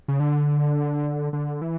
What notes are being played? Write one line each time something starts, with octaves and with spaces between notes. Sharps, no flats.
C#3
D3
D3
E3